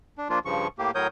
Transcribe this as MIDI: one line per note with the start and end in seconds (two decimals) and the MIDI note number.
0.18 0.29 62
0.30 0.39 53
0.30 0.39 58
0.30 0.39 62
0.30 0.39 65
0.45 0.67 43
0.45 0.67 49
0.45 0.67 53
0.45 0.67 85
0.78 0.91 45
0.78 0.91 58
0.78 0.91 67
0.95 1.07 45
0.95 1.07 54
0.95 1.07 70
0.95 1.07 73
0.95 1.07 87
0.95 1.07 91